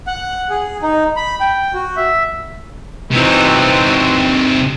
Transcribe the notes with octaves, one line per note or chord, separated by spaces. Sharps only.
F#5
G#4
D#4
B5
G5
F#4
E5
C3 E3 C4 D#4 F#4